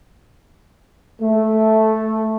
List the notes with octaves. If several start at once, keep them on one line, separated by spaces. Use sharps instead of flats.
A3